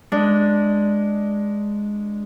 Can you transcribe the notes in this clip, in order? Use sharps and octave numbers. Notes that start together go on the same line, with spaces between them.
G#3 D4